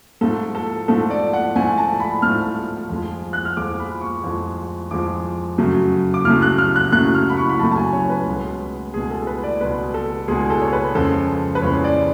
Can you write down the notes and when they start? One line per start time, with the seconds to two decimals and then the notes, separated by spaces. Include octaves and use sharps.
0.21 G#2 F3 A3 A4
0.55 A4
0.88 G#2 F3 A3 A4
1.10 D5
1.33 F#5
1.55 G#2 F3 A3 G#5
1.78 A5
2.00 B5
2.22 G#2 F3 A3 F6
2.89 F2 F3 G#3
3.33 F#6
3.45 F6
3.57 F2 F3 G#3 D6
3.79 B5
4.01 C#6
4.24 F2 F3 G#3
4.91 F2 F3 G#3 D6
5.58 F#2 C#3 F#3 A3
6.14 D6
6.25 F#2 C#3 F#3 A3 F6
6.42 F#6
6.58 F6
6.76 F#6
6.92 F#2 C#3 F#3 A3 F#6
7.15 F6
7.29 B5
7.37 C#6
7.50 B5
7.59 F#2 C#3 F#3 A3 A5
7.71 A5
7.76 G#5
7.93 C#5
8.10 B4
8.26 C#2 B2 G#3
8.94 C#2 B2 G#3 G#4
9.10 A4
9.27 B4
9.44 D5
9.60 C#2 B2 G#3 B4
9.94 A4
10.28 C#2 B2 G#3 G#4
10.50 A4
10.62 C#5
10.73 B4
10.95 F2 C#3 G#3 A4
11.55 B4
11.62 F2 C#3 G#3 C#5
11.84 D5